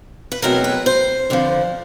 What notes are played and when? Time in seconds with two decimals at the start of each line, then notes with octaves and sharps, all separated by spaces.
0.32 B4
0.42 E2 B2 F#3 A3 C4 A#4
0.64 B4
0.86 C5
1.30 F2 D3 F3